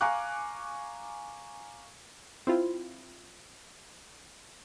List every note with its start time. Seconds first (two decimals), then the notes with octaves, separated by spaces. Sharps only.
0.01 F5 G#5 A#5 C#6 D6 F#6
2.47 C4 E4 F4